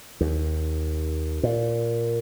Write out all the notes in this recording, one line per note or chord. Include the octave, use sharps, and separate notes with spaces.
D#2
A#2